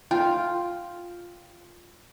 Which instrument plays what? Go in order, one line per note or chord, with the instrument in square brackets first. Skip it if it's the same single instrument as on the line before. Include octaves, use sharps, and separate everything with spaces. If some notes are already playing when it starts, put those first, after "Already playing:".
[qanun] F4 [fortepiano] G5